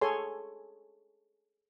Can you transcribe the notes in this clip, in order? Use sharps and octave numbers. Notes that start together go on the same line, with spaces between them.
G#4 A4 C#5 G#5 C6